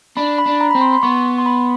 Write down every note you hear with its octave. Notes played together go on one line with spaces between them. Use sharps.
D4 B5
B5
D4
A#5
C4 B5
C6
C6
B3 C#6
C6
B5